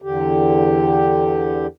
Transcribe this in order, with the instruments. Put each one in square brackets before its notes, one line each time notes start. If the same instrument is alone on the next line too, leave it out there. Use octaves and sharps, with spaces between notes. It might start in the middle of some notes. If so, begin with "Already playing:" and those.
[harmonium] E2 D3 G4